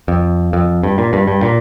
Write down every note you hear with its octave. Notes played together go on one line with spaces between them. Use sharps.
F2
F2
G2
A#2
G2
G2
A#2